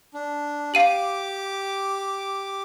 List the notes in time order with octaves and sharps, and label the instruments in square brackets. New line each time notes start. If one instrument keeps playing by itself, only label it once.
[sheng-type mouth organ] D4
[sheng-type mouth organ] G4 D6 [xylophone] F5 D#7 F#7